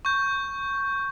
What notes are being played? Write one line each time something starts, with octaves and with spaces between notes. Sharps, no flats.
C#6 G6